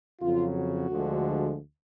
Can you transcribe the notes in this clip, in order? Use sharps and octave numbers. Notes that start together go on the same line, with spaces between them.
F2 C#3 F#3 F4
F#4
D2 D3 F3 G#3